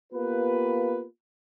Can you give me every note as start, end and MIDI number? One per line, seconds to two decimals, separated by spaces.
0.13 1.04 58
0.13 1.04 59
0.13 1.04 65
0.13 1.04 67
0.13 1.04 71